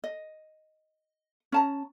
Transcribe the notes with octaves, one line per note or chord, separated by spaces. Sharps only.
D#5
C#4 A5 A#5